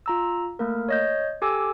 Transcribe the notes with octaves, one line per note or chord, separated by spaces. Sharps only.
F4 A#5 E6
A3 A#3 A#4
C#5 D#5 G6
G4 A4 G#5 D6 E6